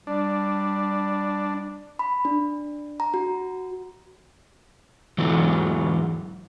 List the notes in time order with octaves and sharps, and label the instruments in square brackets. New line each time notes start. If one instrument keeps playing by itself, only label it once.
[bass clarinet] G3 [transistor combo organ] D4
[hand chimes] B5
D4
A#5
F#4
[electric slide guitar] E2 G#2 E3 F#3